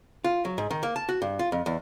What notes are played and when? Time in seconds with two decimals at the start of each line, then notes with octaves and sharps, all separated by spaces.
0.24 F4
0.45 F#3
0.58 G#2
0.71 D#3
0.83 A#3
0.96 A5
1.09 F#4
1.22 G2
1.39 F4
1.52 F2
1.66 E2